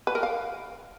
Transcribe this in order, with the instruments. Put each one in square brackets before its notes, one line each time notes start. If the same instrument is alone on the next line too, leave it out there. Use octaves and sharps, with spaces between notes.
[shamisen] B4
A#4
F5